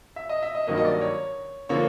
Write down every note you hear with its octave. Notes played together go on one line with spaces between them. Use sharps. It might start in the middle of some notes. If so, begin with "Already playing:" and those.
E5
D#5
E5
D#5
G2 D#3 F#3 A#3 D#5
D#5
D5
C#5
D3 F3 A#3 C#5